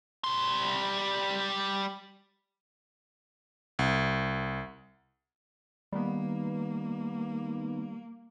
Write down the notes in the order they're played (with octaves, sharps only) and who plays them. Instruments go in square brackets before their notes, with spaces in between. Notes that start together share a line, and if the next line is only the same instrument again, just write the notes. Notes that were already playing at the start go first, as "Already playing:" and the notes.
[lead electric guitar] G3 C6
[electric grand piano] C2
[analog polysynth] D#3 B3 [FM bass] G3 [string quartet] A#3